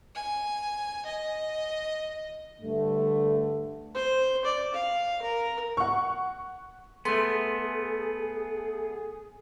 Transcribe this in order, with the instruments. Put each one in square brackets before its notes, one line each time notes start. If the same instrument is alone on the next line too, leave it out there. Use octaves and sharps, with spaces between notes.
[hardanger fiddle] G#5
D#5
[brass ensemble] G2 D3 A3
[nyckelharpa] C5
D5
F5
A#4
[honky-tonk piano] F#5 C#6
[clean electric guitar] A3 B3 [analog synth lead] G#4 [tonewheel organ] A4 [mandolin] C6